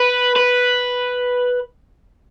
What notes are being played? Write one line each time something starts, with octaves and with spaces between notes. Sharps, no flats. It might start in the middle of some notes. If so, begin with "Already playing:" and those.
Already playing: B4
B4